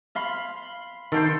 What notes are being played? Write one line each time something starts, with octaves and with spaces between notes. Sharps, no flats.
F5 B5 C6
D#3 A4 G5 C6